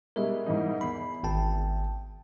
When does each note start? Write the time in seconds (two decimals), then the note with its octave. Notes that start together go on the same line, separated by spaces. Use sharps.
0.16 B2 G3 G#3 A#4 E5
0.46 G#2 E3 D#4
0.81 E2 B5 C7
1.23 G#1 G5 A5